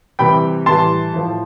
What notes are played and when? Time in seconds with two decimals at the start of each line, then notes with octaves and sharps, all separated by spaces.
0.19 C3 E3 G3 G5 B5
0.66 A2 E3 G3 A5 C6
1.13 A2 F3